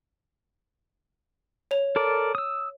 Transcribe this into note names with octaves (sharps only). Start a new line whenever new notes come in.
C#5 F7
A4 A#4 D5
D#6 E6